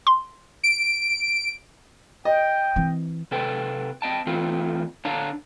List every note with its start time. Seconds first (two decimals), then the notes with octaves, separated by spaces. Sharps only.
0.07 C6
0.64 D7
2.25 D#5 G5
2.76 E3 C4
3.31 C3 A4 B4 G5
4.02 C4 D#5 G5 A5
4.27 E3 A3 C4 F4
5.05 D3 D4 C#5 F5 A5 A#5